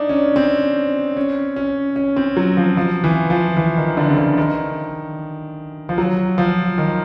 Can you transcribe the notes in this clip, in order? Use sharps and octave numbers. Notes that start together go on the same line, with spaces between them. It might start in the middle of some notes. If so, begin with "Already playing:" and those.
Already playing: D4 D#4
C#4
C4
C#4
C#4
C#4
C4
F#3
F3
F3
E3
F3
E3
D#3
D3
C#3
D3
D#3
F3
F#3
F3
D#3